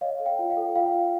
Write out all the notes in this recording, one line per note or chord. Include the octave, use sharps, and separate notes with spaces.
C#5 D#5 F5
A4
F5 G5
F4
F5 G5
A4
F4 F5 G5
F4